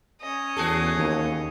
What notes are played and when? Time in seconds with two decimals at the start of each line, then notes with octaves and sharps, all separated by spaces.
0.22 C#4 D#5
0.57 E2 F#4 G#4 A4
0.96 D#2